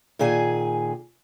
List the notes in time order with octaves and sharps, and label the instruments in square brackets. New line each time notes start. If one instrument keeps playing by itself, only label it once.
[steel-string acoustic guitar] A#2 D#3 G#4 G#5